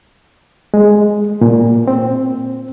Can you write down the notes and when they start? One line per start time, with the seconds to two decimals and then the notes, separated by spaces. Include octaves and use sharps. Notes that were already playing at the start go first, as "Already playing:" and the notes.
0.74 G#3
1.41 A#2
1.88 C4